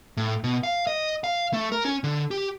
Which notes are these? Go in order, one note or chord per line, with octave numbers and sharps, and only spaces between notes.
A2
B2
F5
D#5
F5
A3
A#4
C#4
D3
G4